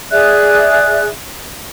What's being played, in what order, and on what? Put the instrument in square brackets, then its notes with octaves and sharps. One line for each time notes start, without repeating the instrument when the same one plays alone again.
[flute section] G#4 D5 E5 F#6